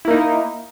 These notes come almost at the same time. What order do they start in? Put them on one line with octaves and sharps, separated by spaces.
E4 A#3 D#4